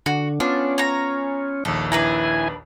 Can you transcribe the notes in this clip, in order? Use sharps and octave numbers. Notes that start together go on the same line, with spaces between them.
D3 F#4
B3 C#4 D4 F4
C#5 A#5
A#1 D#2 A4
D4 E4 B4 G#5 A#5